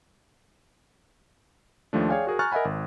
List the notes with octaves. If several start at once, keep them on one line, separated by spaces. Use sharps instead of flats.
D#2 F3 A3 D4
G#4 C#5 D5 F5 G5 G#5
F#4 G#4 A#4
G#5 A#5 C#6 F6 F#6 A6
A#4 D#5 E5 F#5 G#5 B5
G#1